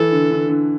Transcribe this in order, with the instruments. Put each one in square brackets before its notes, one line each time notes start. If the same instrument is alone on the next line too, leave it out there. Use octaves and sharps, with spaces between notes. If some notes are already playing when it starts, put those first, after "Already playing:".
Already playing: [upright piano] E3 [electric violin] A4
[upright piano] D3
D3
D3